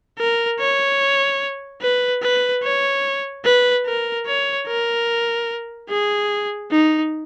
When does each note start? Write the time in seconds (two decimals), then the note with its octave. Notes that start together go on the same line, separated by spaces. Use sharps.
0.19 A#4
0.59 C#5
1.82 B4
2.23 B4
2.63 C#5
3.45 B4
3.86 A#4
4.27 C#5
4.67 A#4
5.89 G#4
6.71 D#4